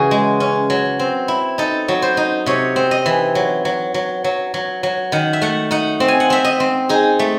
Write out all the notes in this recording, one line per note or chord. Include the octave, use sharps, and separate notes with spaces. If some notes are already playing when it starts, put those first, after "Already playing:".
Already playing: C#3 E3 F#4 G#4
G#3
C#4
F#3
C4
E4
D#4 A4
F#3
C5
D#4
C3 C#5
C4
D#5
E3
F#3
F#3
F#3
F#3
F#3
F#3
D#3 F#5
E5
A3 F#5
D#4 F#5
C4
G#5
F#5
C4 E5
D#5
C4
D#4 G#4
A3